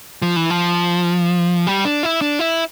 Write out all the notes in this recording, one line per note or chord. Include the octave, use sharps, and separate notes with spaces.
F3
E3
F3
G3
D4
E4
D4
E4